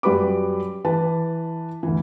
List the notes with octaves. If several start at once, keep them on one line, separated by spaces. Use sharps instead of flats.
F#2 G3 F#4 B4 B5 D6
E3 B4 A5
D2 E3